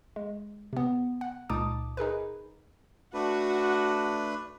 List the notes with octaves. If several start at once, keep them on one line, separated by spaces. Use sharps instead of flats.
G#3
C3 B3
F#5
C#2 A#2 D#4 A5 D6 D#6
D#4 G#4 A#4 B4
A3 D4 F#4 B4